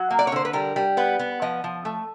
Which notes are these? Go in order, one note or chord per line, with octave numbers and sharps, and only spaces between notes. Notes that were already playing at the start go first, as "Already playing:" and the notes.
Already playing: F#3 F#4
A#3
D5
C#5
D3 C5
B4
G3 A#4
G3
B3 B4
B3
F3 D#5
F3
A3